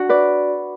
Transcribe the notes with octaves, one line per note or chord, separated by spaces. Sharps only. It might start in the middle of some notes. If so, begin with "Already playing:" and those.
Already playing: D4 F#4
B4 D5